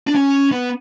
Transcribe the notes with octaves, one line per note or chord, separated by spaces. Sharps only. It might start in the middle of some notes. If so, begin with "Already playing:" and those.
D4
C#4
B3